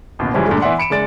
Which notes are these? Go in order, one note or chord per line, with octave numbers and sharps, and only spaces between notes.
A1 D#2 B2
F#2 C#3 E3 F3 G3 G#3
G2 A#2 D3 G#3 A3
E3 B3 D5 E5 F#5 C6
B5 C#7 D7 E7
F#1 G#3 D5 A6 D7